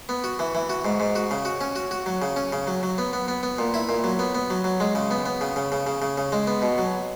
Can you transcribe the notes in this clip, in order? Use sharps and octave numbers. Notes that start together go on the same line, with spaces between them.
B3
F#4
E3
E3
F#4
G#2
G#2
F#4
C#3
F#4
C#4
F#4
F#4
F#3
C#3
C#4
C#3
F#3
F#3
B3
B3
B3
B3
A#2
E4
A#2
F#3
B3
B3
F#3
F#3
G#3
C#3
B3
B3
C#3
C#3
C#3
C#3
C#3
C#3
G#3
B3
B2
F#3